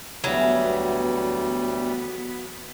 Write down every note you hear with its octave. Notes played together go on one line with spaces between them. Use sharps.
D2 E3 F#3 G3 B3 B5